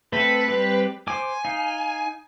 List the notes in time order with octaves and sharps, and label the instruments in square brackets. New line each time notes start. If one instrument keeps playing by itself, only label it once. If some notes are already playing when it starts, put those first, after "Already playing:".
[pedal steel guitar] A3 C4 A4 [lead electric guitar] B4
[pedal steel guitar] G3 C4 G4
[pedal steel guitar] C5 D6 [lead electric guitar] G#5
[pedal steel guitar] D#4 F5